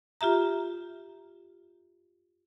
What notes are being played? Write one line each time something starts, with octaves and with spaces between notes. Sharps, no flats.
F4 G4 E5 A#5